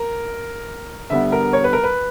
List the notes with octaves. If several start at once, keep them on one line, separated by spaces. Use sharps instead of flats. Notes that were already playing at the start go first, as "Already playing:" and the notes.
Already playing: A#4
D3 G3 B3 E5
A#4
C#5
B4
A#4
B4